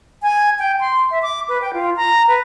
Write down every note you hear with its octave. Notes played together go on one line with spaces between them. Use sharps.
G#5
G5
C6
E5
D6
B4
G5
F4
A#5
B4